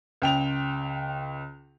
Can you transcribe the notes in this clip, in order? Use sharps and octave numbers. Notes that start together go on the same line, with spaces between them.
C#2 G5 F7